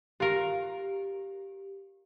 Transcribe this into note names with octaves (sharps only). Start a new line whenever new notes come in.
F4 G4 A#4